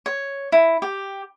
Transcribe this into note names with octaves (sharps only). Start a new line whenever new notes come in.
C#5
E4
G4